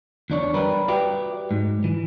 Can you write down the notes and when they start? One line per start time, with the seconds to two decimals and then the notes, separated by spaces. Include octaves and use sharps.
0.30 E2 D4 C#5
0.54 G3 A#4 B4
0.88 F#4 G4 B4 D5 E5 G5
1.51 G#2
1.84 E3